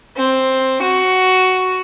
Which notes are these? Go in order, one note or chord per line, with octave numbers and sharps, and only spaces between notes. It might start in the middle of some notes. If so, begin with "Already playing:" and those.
C4
F#4